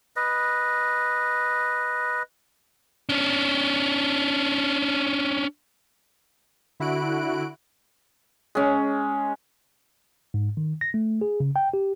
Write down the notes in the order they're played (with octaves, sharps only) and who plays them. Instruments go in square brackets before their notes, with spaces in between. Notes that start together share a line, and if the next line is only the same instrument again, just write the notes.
[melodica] B4 D#5
[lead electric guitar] C#4 D4
[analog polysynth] D3 E4 F#4 F#6 D7
[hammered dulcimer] G#3 C#4
[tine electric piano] G#2
D#3
A#6
A3
G#4
C#3
G5
G4